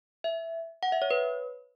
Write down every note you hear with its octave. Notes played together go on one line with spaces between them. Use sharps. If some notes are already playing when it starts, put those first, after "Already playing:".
E5
F#5
E5
C#5
B4